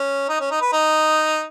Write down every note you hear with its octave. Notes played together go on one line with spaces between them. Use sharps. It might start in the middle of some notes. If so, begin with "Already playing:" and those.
Already playing: C#4
D#4
C#4
D#4
B4
D#4